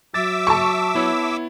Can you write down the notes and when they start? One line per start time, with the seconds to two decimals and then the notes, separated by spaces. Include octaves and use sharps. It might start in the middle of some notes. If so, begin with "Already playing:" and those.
0.14 F#3 E5 D6 E6 A6
0.47 A5 C#6
0.95 B3 E4 C#5